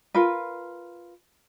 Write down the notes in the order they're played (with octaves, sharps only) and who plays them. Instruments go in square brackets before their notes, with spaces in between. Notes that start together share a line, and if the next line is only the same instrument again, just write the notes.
[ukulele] F4 A#4 B4